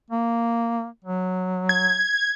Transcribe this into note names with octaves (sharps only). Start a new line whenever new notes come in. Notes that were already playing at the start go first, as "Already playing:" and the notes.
A#3
F#3
G#6